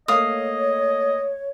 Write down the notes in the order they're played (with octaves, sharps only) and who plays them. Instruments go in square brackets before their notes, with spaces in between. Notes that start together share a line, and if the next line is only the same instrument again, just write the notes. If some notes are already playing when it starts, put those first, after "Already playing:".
[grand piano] A3 A#3 [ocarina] C#5 [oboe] D#5 [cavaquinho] F5 D#6